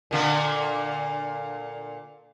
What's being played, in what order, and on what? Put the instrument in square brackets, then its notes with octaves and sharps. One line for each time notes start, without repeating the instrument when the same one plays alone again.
[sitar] A#2 D3 A#3